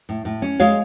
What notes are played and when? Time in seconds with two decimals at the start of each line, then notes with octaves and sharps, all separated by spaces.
0.09 A2
0.25 A2
0.42 C#4
0.60 G#3 C#5 F5